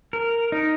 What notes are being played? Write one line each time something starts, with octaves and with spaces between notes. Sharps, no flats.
A#4
D#4